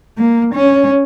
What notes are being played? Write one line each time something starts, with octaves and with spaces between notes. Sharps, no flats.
A#3
C#4